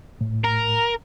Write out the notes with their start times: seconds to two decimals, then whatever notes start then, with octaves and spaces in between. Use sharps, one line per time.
0.21 A2
0.44 A#4